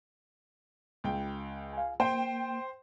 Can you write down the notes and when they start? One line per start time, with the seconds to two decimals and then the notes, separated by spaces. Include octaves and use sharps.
1.04 C#2 G5
1.73 F5 G#5
2.00 A#3 C5 G5